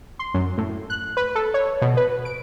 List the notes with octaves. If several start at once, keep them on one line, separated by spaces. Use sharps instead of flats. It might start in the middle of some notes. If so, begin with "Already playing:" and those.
C6
F#2
A2
F#6
B4
A4
C#5
B2
B4
D7